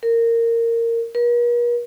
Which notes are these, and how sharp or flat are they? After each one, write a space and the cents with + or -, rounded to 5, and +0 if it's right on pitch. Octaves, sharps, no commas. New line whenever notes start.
A#4 -15
A#4 +45